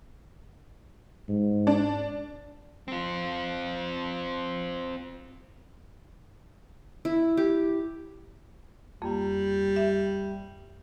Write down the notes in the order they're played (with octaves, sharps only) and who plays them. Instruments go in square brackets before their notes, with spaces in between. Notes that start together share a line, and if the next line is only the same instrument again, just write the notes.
[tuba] G#2
[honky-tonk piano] D4
[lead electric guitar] C4 F4
[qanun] E4
G4
[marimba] F2 A#3 [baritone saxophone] G3
[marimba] E5